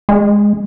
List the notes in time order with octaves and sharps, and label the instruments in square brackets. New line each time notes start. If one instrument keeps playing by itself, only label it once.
[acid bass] G#3